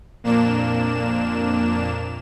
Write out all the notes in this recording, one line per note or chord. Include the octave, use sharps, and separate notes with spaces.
F2 A#2 A#3 D4 E7